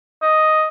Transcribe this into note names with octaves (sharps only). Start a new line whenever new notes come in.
D#5